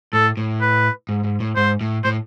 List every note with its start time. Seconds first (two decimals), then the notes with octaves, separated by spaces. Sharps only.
0.13 A2 A4
0.37 A2
0.61 B4
1.09 G#2
1.24 G#2
1.40 A2
1.56 G#2 C5
1.81 A2
2.04 A2 C5